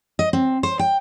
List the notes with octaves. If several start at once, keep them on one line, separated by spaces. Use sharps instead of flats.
D#5
C4
C5
G5